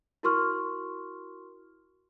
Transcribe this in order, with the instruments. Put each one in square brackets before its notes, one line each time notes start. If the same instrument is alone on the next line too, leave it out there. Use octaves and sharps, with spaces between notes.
[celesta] E4 F#4 A#4 C6 C#6 F6